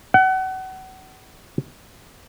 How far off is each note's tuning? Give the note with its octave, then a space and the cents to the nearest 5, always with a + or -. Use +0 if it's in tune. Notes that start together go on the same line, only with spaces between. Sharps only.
F#5 +30